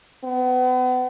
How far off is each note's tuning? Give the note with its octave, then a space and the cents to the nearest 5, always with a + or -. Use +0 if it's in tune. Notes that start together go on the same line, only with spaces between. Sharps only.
B3 +35